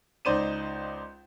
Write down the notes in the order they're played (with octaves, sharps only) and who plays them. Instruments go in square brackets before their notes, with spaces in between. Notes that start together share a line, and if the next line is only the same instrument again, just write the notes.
[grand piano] C#2 D#4 C5 D5 D#7